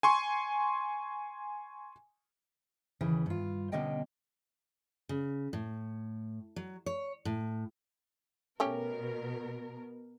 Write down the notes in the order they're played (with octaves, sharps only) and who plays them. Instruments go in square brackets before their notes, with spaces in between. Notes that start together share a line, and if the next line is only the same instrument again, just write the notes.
[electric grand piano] G#5 C6 C#6
[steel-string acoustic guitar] D#2 C#3 E3
G2 F4
B2 D3 A#3 C#4 D#5 G5
C#3
A2
F#3
C#5
A2
[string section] B2 A#4 [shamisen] A3 C#4 G4